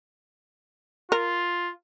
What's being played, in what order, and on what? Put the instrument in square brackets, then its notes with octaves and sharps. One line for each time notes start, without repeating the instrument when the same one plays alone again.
[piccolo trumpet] F4 [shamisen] A#4